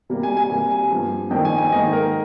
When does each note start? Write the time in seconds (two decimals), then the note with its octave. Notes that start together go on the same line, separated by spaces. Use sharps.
0.10 C3 G3 A#3
0.23 G#5
0.37 G#5
0.50 C3 G3 A#3 G#5
0.71 G#5
0.91 G2 F3 A#3
1.30 F2 D#3 A#3 G5
1.45 G#5
1.58 G#5
1.72 G#2 D#3 A#3 D#5
1.93 A#4